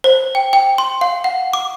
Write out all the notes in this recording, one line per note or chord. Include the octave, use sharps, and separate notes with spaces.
C5
G5
G5
C6
F5
F#5
D6